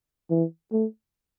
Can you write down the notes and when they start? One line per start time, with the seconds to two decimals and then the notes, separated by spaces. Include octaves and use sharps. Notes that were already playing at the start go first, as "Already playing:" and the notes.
0.30 E3
0.72 A3